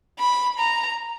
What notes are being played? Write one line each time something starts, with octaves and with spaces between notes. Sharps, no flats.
B5
A#5